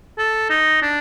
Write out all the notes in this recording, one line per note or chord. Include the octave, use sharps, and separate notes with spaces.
A4
D#4
D4